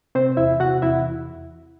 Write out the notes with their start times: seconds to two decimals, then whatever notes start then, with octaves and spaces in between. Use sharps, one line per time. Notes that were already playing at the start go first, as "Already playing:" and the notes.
0.15 C3 C4 C5
0.37 E2 E4 E5
0.60 C3 F#4 F#5
0.82 E2 E4 E5